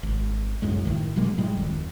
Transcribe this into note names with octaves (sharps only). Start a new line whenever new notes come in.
G#1
B1 F#2 A2 G#3
A#1 A2 D#3
B2 F#3 G#3 A#3
A2 G3 G#3
D1 F2 D#3